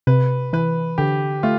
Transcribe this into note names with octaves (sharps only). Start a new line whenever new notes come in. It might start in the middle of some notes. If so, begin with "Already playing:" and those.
C3 B4
E3 B4
D3 G4
A3 F4